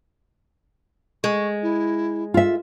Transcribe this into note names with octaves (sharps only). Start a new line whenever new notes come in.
G#3 C#6
E4
F4 E5